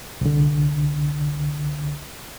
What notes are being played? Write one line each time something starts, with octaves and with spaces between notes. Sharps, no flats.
C2 D3